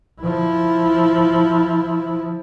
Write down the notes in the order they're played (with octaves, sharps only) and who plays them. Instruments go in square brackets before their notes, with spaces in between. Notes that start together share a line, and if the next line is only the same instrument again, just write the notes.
[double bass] F3 E4